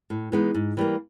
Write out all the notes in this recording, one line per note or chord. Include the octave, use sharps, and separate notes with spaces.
A2
E3 G#3 B3 D#4
G#2
E3 G3 A#3